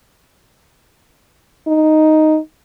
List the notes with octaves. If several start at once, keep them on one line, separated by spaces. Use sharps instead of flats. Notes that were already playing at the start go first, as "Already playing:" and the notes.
D#4